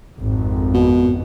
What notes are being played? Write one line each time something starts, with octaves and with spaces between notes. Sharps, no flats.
G#1 F2
B2